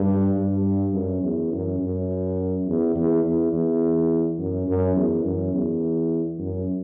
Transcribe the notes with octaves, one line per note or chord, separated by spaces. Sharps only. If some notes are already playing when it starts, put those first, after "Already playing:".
Already playing: G2
G2
F#2
E2
F#2
F#2
E2
E2
E2
E2
F#2
F#2
E2
F#2
E2
F#2